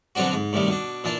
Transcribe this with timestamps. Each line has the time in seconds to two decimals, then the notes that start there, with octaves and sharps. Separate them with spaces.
0.15 B2 D3 F#3 C4 D4 F#4
0.33 G#2
0.53 A2 C3 D#3 G3
0.67 B2 D4
1.04 A#2 E3 D4 A5